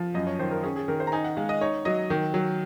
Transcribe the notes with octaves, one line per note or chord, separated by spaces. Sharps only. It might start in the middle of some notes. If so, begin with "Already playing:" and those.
Already playing: F3
F#2 D#5
C#5
D#3 C5
A#4
C#4 G#4
G#4
D#3 A#4
C5
A#5
D#4 G#5
F#5
G#3 F5
D#5
D#4 C#5
F#3 D#5
D#3
F#3